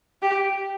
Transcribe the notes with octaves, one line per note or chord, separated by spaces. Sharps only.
G4